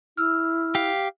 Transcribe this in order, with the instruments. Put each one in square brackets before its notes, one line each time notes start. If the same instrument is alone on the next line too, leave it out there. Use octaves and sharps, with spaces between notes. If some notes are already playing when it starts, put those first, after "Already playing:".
[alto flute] E4 [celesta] E6 F6
[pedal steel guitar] G4 F5